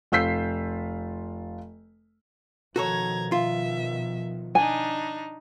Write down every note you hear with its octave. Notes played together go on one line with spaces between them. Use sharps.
F1 F4 E6 G6 B6 C7
B2 D#3 F3 F#4 A4 C#5 A#5 G#6
F4 E5
D4 D#4 G#5